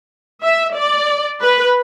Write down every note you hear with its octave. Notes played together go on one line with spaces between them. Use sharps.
E5
D5
B4